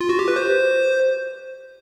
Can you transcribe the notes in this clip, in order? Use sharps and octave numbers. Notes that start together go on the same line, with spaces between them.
F4
F#4
G4
B4
C5